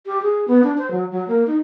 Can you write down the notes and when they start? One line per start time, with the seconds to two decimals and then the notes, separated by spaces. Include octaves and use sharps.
0.06 G4
0.22 G#4
0.48 B3
0.64 D4
0.78 C5
0.91 F#3
1.12 F#3
1.28 A#3
1.47 D#4